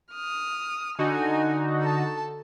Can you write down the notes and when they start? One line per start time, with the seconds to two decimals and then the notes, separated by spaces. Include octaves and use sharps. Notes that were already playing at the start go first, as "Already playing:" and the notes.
0.12 D#6 F6
0.98 D3 D#4 F#4 G#5
1.81 A4 A5